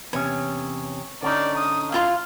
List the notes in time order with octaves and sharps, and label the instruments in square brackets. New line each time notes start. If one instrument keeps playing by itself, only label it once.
[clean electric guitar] E2 C3 C#4 [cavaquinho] C#5
[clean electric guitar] D3 C#4 D#4 [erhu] D5
[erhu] D#6
[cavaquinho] E4 F4 C6 [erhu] F5